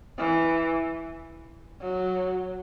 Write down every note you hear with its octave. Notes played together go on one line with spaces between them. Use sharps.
E3
F#3